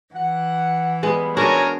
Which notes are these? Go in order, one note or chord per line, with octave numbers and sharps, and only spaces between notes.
E3 F#5
G3 G#3 B3 B5
G#3 D4 F#4 A#4 C#5 G#5